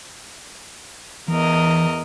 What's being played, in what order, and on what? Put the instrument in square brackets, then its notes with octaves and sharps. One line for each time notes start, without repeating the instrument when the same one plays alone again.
[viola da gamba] E2 A#4 D#5 [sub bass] E3